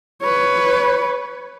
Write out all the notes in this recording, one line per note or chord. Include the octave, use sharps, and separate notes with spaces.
B4 C#5